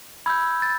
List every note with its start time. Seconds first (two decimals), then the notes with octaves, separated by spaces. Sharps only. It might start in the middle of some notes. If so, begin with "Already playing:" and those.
0.26 B5 E6 G6 G#6
0.62 A6